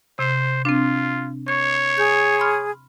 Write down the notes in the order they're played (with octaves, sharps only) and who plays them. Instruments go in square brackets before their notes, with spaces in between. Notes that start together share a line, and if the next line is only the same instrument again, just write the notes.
[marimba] C3 [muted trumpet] C5
[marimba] C4 D4 [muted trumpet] F4
[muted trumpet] C#5 [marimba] C#6
[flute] G#4 [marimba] G6
[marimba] B5 C6 F6